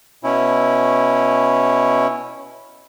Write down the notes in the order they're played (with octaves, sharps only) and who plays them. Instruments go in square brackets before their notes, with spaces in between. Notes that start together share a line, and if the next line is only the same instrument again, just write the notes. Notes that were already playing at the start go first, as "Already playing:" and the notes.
[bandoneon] B2 C#4 E4